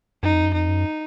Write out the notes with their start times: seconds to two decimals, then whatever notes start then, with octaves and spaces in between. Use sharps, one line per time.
0.23 F#2 D#4
0.33 F2
0.43 F#2
0.53 F2 D#4
0.69 F#2